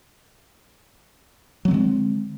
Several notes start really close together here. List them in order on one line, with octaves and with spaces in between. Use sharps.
F#3 C4 D3 G#3